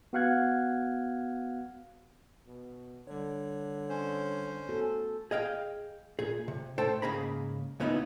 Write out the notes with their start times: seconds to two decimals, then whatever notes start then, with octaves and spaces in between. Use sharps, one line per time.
0.13 B3 F#4 F5 F#5 F#6 G#6
2.47 B2
3.07 D3 G3 C#5
3.89 C#4 C5
4.69 B3 F#4 A4
5.31 G#4 D#5 F5 G5
6.19 A#2 G#4
6.48 C3
6.78 A2 A4 C5 G5 A5
7.02 G#2 C#3 A#3 G#4 A#5 B5
7.80 D2 A#2 B3 C#4 D#4 E4